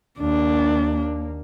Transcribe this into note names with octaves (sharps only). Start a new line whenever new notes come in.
D#2 A#3 D4